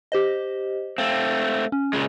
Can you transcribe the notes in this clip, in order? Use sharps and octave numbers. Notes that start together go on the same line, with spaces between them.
G4 C5 D#5
A3 C4 F5
C#4
A#2 C#3 G#3